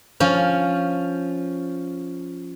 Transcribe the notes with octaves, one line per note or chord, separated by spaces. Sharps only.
F3 C#4